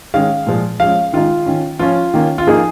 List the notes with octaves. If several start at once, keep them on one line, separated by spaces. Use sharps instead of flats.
D#3 G#3 C#4 F5
A#2 F3 G#3
F3 G#3 C#4 F5
D#3 G#3 D#4 F4
D#3 C#4
F3 C#4 F4
D#3 A#3 C#4
F4
F3 A#3 D#4 G#4